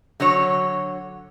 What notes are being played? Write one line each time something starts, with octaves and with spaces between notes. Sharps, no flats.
D3 F#3 F#4 C#5